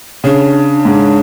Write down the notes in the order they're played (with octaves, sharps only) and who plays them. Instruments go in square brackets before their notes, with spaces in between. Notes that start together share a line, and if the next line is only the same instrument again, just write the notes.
[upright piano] C#3 [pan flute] D4
[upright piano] G#2